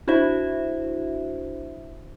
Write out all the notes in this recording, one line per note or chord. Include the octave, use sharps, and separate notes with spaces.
D4 E4 F#4 C5 E5